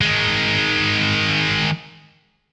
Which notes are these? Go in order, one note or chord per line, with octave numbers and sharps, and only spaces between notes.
D#3 G#3